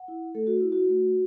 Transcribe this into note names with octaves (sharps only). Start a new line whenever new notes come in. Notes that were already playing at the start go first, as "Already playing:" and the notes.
Already playing: F#5
E4
A3 A4
F#4
E4
F#4
A3